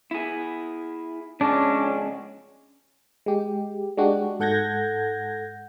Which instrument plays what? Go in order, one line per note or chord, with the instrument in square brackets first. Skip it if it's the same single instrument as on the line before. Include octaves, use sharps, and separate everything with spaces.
[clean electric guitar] E4 G#4
[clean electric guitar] F2 C#3 G#3 [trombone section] C#4 [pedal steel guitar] D4
[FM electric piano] G#3 G4
G#3 D4 F#4 G4
G#2 A4 F#5 G6 G#6 A#6